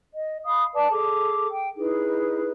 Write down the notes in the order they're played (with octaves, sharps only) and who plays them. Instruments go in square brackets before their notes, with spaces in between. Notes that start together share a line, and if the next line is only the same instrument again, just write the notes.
[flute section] D#5
F5 B5 D#6
B4 D5 A5 D6
G#4 A4 D6
G5
D#4 E4 G#4 B4